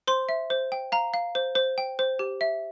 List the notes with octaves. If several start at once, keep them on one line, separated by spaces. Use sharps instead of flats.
C5 C6
E5
C5
G5
F5 A#5
F5
C5
C5
G5
C5
G4
E5